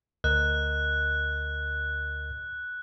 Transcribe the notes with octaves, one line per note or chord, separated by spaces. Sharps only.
D2 A#4 D#5 F#6